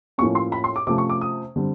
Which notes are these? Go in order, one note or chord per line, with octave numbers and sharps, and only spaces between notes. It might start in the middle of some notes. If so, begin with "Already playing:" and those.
A2 F3 A#3 C#4 C#6
C6
B5
C6
D6
C3 F3 A3 C#4 D6
C#6
D6
D#6
D3 G3 C4